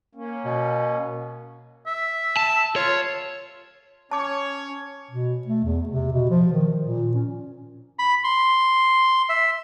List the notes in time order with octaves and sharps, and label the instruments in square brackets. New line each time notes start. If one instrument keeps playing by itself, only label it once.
[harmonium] A#3 C#4
[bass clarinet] B2
[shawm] E5
[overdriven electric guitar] A5
[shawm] F4 [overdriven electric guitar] C#5
[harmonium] C#4 [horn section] C#5 [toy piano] A5 D6
[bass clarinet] B2
A3
E2
C3
B2
F3
D#3
A#2
C#4
[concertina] B5
C6
E5